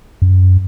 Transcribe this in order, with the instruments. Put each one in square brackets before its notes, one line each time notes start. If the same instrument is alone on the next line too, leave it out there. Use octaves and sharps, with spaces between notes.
[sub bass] F#2